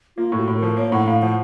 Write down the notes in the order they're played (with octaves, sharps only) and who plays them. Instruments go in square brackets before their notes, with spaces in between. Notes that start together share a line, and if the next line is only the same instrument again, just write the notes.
[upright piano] A#3 [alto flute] F4
[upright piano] A2
[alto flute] F#4
[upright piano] A2
[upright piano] F3 [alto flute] A#4
[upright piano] A#3 [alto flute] C#5
[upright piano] A2 [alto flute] F#5
[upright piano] A2 [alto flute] F5
[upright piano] F3 [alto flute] F#5